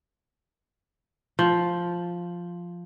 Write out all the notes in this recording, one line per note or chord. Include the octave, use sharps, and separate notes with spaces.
F3